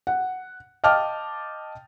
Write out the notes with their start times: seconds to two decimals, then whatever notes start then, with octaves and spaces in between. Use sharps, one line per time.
0.07 F#5
0.84 D#5 F5 G5 A5 D6 F6